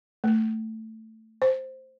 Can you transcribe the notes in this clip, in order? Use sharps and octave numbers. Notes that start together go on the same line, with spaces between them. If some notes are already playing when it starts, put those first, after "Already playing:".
A3
C5